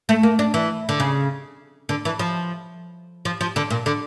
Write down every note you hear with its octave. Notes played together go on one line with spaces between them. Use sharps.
A3
A#3
D4
E3
D3
C#3
D3
E3
F3
F3
F3
D3
A#2
D3